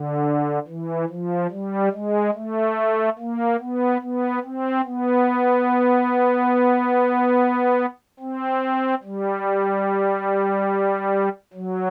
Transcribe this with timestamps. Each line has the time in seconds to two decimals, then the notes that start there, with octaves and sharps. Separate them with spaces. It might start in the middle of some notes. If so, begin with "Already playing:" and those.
Already playing: D3
0.68 E3
1.09 F3
1.51 G3
1.93 G#3
2.34 A3
3.19 A#3
3.60 B3
4.01 B3
4.44 C4
4.85 B3
8.19 C4
9.03 G3
11.53 F#3